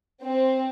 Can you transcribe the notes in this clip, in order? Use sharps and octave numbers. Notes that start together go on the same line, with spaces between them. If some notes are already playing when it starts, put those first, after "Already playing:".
C4